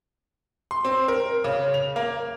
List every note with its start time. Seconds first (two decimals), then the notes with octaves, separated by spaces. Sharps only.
0.71 C6
0.85 C4
1.08 A#4
1.44 C#3
1.74 F7
1.96 A#3